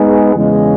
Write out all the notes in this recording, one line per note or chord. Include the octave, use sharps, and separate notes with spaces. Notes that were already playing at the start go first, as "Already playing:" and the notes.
Already playing: G#3 B3 D#4 G#4
E2 C#3 G#3